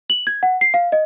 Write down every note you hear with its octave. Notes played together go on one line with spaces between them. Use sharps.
F#7
G#6
F#5
C7
F5
D#5